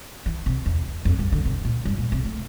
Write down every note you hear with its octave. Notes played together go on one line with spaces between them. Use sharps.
E3
C3
E2
F2
G2
D3
C3
A#2
G2
A#2
C3
A3